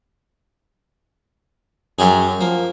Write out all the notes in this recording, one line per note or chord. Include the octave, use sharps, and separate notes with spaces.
F#2 F#3 G4 G#4
F3 A#3